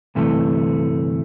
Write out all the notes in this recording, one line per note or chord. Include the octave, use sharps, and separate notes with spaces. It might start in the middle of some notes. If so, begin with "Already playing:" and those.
D2 G2 C3 E3 A3